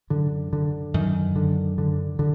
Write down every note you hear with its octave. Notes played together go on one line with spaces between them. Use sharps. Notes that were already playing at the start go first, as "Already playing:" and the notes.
F#2 D3
D3
F#2 D#3
D3
D3
D3